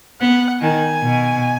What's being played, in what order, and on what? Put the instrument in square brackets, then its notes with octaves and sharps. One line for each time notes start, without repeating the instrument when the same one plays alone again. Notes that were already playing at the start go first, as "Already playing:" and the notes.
[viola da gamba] B3 [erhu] F#5
[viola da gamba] D#3 [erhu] G#5
[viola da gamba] B2